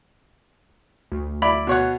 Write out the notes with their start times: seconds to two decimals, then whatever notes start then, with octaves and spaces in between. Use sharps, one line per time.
1.12 D2
1.42 E4 D5 B5
1.67 B2 C#5 F#5